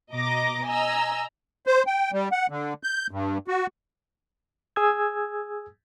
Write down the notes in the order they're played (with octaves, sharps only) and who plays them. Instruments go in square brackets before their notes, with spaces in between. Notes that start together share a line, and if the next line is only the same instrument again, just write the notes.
[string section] B2 D#5 A#5 D6 A#6
D#5 G#5 A#5 E6
[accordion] C5
G5
G3
F#5
D3
G6
G2
F#4
[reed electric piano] G#4 G#5 D#6 E6 G#6